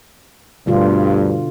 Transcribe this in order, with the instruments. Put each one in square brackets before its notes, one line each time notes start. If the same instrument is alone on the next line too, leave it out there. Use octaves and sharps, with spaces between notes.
[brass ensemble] D2 G2 [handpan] B2 D3 F4